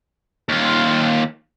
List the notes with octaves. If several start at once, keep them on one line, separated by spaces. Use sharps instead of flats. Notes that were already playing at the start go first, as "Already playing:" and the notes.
D#2 F4